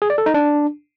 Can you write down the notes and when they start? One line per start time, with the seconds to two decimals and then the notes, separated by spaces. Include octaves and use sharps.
0.02 G#4
0.10 D5
0.18 A4
0.26 D#4
0.34 D4